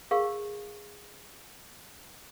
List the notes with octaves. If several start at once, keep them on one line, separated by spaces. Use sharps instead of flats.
G#4 A#4 F5 C#6